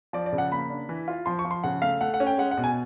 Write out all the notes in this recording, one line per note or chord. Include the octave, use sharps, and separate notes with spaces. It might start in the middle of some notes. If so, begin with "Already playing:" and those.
F3 D5
D5
C#3
F#5
A#3 B5
D4
E3
F4
F3 C6
C#6
F3
C6
C#3 F#5
A3 F5
A3 F#5
F#5
C#4
G5
G#3 F#5
F#5
B2
G#5